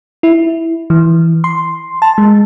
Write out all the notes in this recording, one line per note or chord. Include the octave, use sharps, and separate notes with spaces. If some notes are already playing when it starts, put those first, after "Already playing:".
E4
E3
C6
A5
G#3